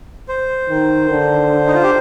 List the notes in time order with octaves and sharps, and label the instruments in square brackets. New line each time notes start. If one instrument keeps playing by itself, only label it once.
[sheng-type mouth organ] C5
[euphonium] D#3
D3
[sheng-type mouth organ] D#4
F4
G4